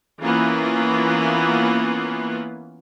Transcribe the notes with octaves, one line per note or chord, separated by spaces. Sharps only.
E3 A#3 B3 C#4 F4